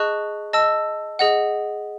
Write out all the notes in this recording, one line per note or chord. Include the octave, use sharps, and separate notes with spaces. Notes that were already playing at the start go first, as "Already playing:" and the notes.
Already playing: G#4 D#5 A5 C#6 F#6
D#5 A5 E6
G#4 D#5 F#5